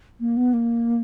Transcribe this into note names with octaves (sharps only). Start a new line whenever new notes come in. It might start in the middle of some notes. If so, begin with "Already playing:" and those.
A#3
B3
A#3